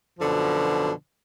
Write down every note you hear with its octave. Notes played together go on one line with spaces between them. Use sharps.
F#2 B2 D3 F3